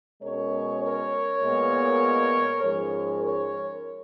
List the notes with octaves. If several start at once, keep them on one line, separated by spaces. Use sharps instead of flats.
B2 G#3 C#4 A#4 C#5
A#4 C#5
A#2 G#3 B3
G#2 F3 G#3 C#4 A#4 C#5
A#4 C#5